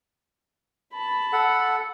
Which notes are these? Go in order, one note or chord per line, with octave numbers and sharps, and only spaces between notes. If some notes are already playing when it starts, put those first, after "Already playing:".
A5 B5
A4 F#5